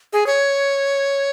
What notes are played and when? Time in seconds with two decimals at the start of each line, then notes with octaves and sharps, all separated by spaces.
0.13 G#4
0.27 C#5